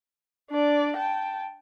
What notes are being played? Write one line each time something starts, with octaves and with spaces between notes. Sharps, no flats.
D4 D5
G5 A5